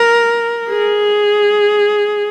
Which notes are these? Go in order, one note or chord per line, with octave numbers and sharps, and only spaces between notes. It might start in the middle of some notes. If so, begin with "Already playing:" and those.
Already playing: A#4
G#4